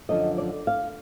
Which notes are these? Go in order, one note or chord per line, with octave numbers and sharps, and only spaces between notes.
F#2 D3 F3 D#5
D5
F5